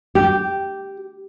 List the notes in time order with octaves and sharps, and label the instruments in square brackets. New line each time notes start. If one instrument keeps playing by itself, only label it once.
[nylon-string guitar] G4